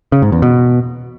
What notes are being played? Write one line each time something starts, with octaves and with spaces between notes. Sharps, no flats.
C#3
G#2
E2
B2